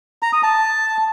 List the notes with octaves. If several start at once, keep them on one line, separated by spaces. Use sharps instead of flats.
A#5
D#6
A5